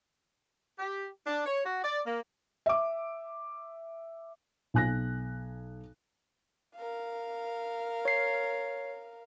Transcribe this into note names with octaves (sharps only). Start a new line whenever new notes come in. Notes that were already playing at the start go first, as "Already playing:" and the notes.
G4
D4
C#5
F#4
D5
A#3
E5 D6
B1 G#5 F#6 A#6
A#4 F5
C#5 C7